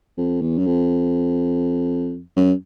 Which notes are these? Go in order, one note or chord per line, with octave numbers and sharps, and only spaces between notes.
F2
E2
F#2
F2
F#2